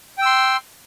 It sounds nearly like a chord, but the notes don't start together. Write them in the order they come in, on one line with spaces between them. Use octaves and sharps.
G5 E6 C6